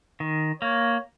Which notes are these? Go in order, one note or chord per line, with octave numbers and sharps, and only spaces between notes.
D#3
A#3 C#5